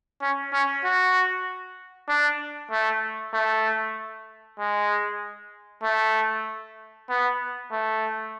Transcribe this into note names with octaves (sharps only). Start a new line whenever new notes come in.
C#4
C#4
F#4
D4
A3
A3
G#3
A3
B3
A3